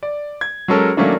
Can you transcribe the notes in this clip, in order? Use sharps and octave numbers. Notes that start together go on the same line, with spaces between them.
D5
G#6
F#3 G#3 C#4 A4 A#4
D#3 F#3 A3 A#3 C#4 D4